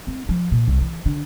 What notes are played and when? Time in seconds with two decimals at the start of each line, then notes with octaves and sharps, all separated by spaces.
0.07 C4
0.29 F3
0.52 A#2
0.67 C2
0.81 E3
1.06 D3